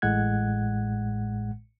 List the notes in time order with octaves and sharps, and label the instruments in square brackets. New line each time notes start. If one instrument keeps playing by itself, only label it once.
[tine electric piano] A1 A2 G#3 F#5 F#6 G#6